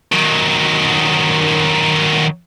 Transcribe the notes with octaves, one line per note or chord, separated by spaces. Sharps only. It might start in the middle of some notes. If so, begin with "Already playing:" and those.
D#3 F#3